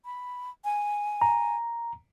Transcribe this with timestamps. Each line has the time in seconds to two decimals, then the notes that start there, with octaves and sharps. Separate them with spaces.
0.05 B5
0.64 G#5
1.22 A#5